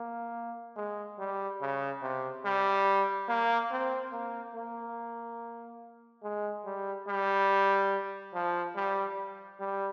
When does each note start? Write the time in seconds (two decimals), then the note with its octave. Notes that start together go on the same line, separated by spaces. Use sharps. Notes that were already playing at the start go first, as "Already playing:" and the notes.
Already playing: A#3
0.76 G#3
1.19 G3
1.61 C#3
2.02 C3
2.45 G3
3.29 A#3
3.71 C4
4.12 A#3
4.55 A#3
6.23 G#3
6.65 G3
7.08 G3
8.34 F3
8.76 G3
9.60 G3